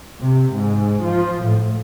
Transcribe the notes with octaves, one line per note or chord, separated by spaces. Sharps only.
C3
G#2
F3
A2